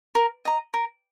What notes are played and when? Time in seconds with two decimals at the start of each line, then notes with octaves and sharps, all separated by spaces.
0.15 A#4
0.45 D#5 A#5
0.74 A#4